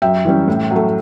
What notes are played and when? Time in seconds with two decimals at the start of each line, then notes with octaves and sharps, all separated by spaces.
0.02 F#2 E5 G5
0.25 E3 G3 C#4
0.48 A2
0.71 F#3 A3